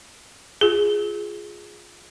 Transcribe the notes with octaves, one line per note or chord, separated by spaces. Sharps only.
F4 G#4